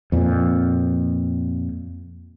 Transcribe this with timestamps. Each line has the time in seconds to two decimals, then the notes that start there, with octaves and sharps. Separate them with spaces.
0.12 F2 A#2